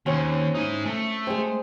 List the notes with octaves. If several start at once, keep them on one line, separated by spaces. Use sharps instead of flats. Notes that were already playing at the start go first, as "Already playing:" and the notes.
D#2 C4 C#4 F#4
D#4 E4 G#5
A3
G#3 C4